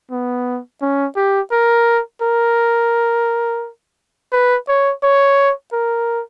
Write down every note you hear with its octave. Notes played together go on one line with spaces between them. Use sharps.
B3
C#4
G4
A#4
A#4
B4
C#5
C#5
A#4